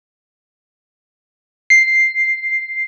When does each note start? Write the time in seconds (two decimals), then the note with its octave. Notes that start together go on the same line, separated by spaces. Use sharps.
1.70 C7